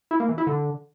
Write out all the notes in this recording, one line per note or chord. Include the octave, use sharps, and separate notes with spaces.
E4
A#3
E3
E4
D3